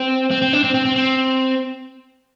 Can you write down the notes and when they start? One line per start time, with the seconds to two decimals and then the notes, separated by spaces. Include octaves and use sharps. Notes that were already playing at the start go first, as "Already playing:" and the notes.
Already playing: C4
0.31 C4
0.42 C4
0.53 D4
0.64 C4
0.74 C4
0.85 C4
0.96 C4